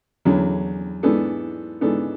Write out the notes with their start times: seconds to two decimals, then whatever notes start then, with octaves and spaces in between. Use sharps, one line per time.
0.25 E2 D3 F#3
1.03 G#2 E3 B3 D4 A4
1.81 G#2 E3 B3 D4 A4